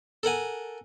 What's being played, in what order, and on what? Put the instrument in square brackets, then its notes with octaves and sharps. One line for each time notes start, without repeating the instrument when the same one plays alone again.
[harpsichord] A4 A#4 F#5 G#5